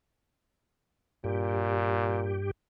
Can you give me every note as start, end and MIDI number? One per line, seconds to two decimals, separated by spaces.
1.24 2.51 43
1.24 2.43 46
1.24 2.51 67